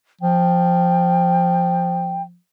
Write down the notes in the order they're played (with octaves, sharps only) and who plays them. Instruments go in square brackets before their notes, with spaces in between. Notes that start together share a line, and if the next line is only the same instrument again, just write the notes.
[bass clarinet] F3 [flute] G5